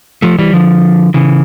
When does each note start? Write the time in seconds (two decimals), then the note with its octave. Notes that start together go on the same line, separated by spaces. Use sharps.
0.22 F3 A3
0.38 E3 G3
0.54 D3 F3
1.14 C#3 E3